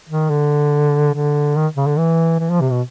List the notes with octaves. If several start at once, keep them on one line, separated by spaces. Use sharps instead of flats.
D#3
D3
D3
D#3
C#3
D3
E3
E3
F3
C3
B2